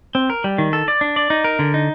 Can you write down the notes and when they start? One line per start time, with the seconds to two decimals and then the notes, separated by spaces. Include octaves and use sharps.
0.15 C4
0.30 A#4
0.44 G3
0.58 D#3
0.73 A4
0.88 D5
1.01 D4
1.16 D5
1.30 D#4
1.44 A#4
1.59 D3
1.74 D#4